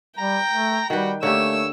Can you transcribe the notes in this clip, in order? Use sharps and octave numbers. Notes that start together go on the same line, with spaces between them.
G3 G5 A#5
A3
D#3 G3 F#4 B4
D3 A3 A#3 G4 C#5 E6